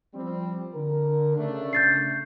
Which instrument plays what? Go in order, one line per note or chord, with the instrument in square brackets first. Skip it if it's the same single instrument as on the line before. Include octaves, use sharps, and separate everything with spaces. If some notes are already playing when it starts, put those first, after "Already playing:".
[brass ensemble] F3 G3 C4
D3 A#4
C#3 A3 D4
[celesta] G6 A6 C7